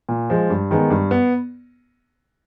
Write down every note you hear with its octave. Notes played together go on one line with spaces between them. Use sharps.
A#2
F3 G#3
G2
D#3 G#3 B3
G2
B3